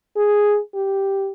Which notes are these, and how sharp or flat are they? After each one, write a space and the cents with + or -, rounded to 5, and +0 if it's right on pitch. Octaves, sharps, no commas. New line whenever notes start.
G#4 +0
G4 -5